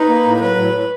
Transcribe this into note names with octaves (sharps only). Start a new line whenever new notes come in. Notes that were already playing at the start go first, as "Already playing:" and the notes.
Already playing: D#4 B4
A#3
A2
F#3 B4
A2
A2